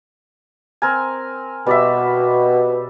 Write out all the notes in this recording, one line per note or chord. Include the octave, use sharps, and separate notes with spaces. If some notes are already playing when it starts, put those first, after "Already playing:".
C4 A#4 G#5
B2 G3 D5 E5